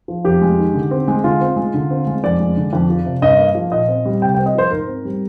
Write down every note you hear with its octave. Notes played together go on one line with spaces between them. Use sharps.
F3
F2 G4
G#3
D#3
D3
C4
G#3
D3 F4
C4
G#3
D3
C4
G#3
F2 D5
G#3
D3
F2
F3
C3
G2 D#5
A#3
F3
A#2 D#5
C4
G3
C3 G5
C4 G5
D#5
F3 C5
G#2 A#4
C4
G3